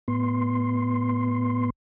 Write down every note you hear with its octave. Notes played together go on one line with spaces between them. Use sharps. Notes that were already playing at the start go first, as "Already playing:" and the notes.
A2 B3 C6